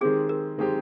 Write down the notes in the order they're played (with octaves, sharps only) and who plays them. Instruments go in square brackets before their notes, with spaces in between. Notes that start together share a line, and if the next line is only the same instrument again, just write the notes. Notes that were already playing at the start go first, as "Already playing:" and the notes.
[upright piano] D#3 G#3 C4 G4 [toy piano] G#4
[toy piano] A#4
[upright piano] D#3 G#3 C4 G4